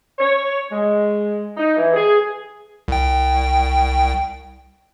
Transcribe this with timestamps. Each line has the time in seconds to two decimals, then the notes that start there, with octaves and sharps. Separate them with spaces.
0.19 C#5
0.72 G#3
1.57 D#4
1.76 E3
1.94 G#4
2.88 C2 G5